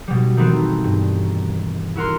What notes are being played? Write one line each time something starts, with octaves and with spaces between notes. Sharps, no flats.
B2 G3
D#3 E3 G3 A3 B3 C4
G2
E4 F#4 A#4 C6